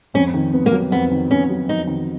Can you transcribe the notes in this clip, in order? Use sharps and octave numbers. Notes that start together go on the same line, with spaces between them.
F2 C#4
D#3
B3
A#3
F#3
F2 B3
D#3
B3 C#4
F#3
F2 D#4
D#3